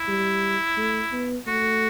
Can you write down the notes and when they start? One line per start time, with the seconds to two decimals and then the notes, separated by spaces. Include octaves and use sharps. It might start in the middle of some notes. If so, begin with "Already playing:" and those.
Already playing: E4
0.08 G3
0.77 A3
1.12 B3
1.47 A3 F#4